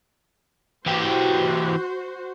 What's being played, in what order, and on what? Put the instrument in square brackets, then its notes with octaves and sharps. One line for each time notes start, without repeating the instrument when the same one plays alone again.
[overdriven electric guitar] E3 G4 [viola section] F#4 C5